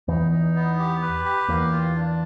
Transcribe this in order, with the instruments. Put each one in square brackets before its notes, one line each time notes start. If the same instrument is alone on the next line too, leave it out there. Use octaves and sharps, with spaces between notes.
[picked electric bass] E2 E3 [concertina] D#4
[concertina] D#4
B3
G4
B4
G4
[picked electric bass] E2 E3 [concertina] A#3
[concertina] F4
D4